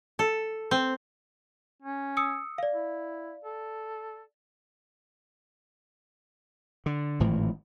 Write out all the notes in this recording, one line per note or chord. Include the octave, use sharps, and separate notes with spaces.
A4
C4
C#4
D#6 E6 C#7
D5 F5
E4
A4
D3
G#1 A2 E3 F3